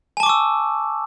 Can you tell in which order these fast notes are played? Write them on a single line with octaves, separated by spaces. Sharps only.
G#5 A5 D6 C#6 E6